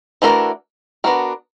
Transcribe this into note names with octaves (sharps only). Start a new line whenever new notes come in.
E3 A3 D4 F#4 A#4
B3 D4 F#4 A#4